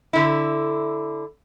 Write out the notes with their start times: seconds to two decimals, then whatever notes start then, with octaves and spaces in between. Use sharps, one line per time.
0.13 D3 E4